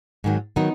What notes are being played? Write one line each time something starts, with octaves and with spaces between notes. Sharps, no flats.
G#2 D#3 F#3
D#3 F#3 B3 D#4